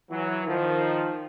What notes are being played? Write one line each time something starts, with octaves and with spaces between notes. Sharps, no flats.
E3 F#3
D#3 F3